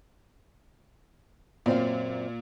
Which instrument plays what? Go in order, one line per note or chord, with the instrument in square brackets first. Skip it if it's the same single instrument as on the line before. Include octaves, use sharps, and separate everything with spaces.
[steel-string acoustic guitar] F#2 C4 F5 [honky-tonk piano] A#2 D5